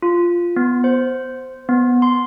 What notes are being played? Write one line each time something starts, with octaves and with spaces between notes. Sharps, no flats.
F4
B3
C5
B3
C6